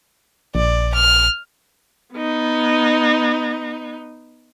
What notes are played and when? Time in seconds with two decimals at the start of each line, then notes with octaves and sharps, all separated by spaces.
0.55 A#1 D5
0.95 F6
2.14 B3 D#4